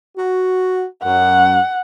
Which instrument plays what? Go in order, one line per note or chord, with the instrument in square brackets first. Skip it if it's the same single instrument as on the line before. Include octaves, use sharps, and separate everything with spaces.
[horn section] F#4
[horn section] F#2 [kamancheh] F#5